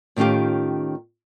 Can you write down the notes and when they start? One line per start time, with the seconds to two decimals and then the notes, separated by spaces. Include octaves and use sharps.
0.16 A2 D#3 C#4 F4 G4